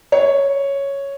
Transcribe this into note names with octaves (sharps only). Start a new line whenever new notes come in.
C#5